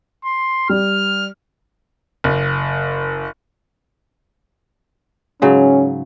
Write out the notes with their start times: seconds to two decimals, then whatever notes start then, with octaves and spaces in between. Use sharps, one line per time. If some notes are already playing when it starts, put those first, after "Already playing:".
0.25 C6
0.69 G3 F6
2.24 F#1
5.42 G#2 C#3 F#3 C#4